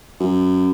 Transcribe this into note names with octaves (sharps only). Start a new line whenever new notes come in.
F#2